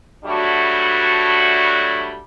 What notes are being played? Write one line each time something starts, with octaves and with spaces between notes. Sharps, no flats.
F#3 G3 A3 D4 E4 F#4